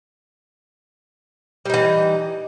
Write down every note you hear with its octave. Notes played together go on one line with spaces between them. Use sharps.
E3 G3 D#4